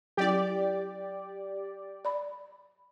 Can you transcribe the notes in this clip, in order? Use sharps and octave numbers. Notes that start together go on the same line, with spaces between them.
F#3 C#4 E4 G4 D5
D5 B5